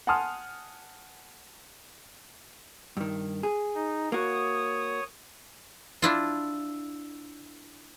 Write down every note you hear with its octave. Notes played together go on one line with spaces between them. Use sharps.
F#5 G#5 A5 C6 D#6 F6
G2 D#3
G#4
D#4
A#3 F#4 C#5 D#6
D4 E4 F4